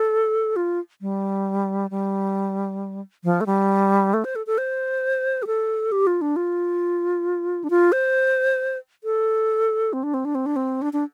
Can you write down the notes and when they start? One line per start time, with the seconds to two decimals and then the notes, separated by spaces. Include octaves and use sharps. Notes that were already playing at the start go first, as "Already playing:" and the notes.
Already playing: A4
0.56 F4
1.01 G3
1.90 G3
3.24 F3
3.41 A3
3.46 G3
4.14 A3
4.24 C5
4.36 A4
4.47 A4
4.58 C5
5.43 G4
5.47 A4
5.92 G4
6.07 F4
6.21 D4
6.36 F4
7.64 D4
7.70 F4
7.92 C5
9.04 A4
9.93 C4
10.03 D4
10.14 C4
10.25 D4
10.35 C4
10.46 D4
10.56 C4
10.82 D4
10.93 D4